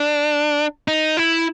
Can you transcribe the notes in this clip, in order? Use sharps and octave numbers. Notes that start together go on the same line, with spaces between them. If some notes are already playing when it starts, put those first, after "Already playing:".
Already playing: D4
D#4
E4